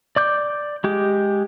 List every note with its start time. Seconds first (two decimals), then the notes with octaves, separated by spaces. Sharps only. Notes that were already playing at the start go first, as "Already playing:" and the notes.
0.16 D5 D6 G6
0.84 G#3 G4